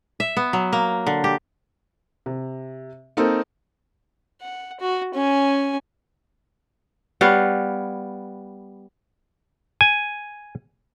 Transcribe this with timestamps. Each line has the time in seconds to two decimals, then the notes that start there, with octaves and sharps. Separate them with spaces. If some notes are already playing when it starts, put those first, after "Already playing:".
0.20 E5
0.37 B3
0.53 F#3
0.73 A#3
1.07 D3
1.24 G4
2.26 C3
3.17 A#3 C4 D#4 A4
4.42 F#5
4.80 F#4
5.14 C#4 G#5
7.21 G3 B3 C#5 F5
9.81 G#5